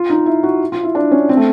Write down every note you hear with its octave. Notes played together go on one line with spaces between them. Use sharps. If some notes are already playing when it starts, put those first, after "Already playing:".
Already playing: F4
D#4
E4
F#4
F4
E4
D4
C#4
C4
A3